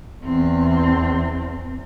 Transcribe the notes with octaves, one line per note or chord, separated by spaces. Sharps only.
E2 C4